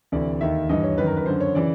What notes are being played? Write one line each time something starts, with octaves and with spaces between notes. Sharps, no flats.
D2 C3 E3 D5
D#2 D#3 E5
G2 E3 D#5
C#5
F#2 D#3 B4
A#4
B4
F#2 D3 C5
C#5
C#3 E3 D5